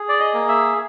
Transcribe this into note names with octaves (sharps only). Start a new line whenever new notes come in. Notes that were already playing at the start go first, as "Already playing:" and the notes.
Already playing: G#4
D5
D#5
A#3
E5